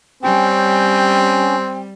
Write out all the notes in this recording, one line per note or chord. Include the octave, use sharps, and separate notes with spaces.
G3 C4 C#4 G5